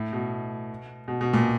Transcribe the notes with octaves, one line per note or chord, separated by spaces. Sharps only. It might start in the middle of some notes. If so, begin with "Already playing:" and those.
Already playing: A2
B2
B2
B2
A#2